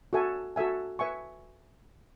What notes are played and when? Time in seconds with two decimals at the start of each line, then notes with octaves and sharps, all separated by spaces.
0.13 F#4 A4 E5 G#5
0.56 F#4 A4 E5 G#5
0.99 B4 E5 G#5 C#6